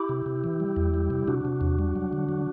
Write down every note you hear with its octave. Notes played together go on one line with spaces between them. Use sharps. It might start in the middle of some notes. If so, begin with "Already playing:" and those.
Already playing: E4 G4
C3
C3
E3
G3
E2
G3
C3
C3 D4 F#4
C3
E2
G3
F#3
D3
F#3